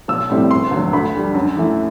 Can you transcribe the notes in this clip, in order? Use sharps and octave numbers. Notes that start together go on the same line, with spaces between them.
B1 E6
A2 G3 C4 E4
E1 C6
D2 D3 F#3
D2 B5
D3 G3
F#2
E3 A3 E4